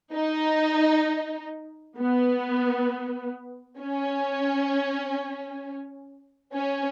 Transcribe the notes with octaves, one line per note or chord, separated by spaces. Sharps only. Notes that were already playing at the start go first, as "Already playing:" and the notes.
D#4
B3
C#4
C#4